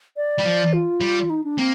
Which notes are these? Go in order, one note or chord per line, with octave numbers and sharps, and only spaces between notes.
D5
G3
F3
F4
G3
D#4
D4
A#3 C4